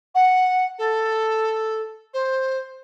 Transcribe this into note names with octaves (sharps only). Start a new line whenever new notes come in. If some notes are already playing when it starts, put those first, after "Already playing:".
F#5
A4
C5